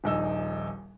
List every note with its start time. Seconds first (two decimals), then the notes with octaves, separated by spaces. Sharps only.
0.04 D#1 A#1 D#4 E6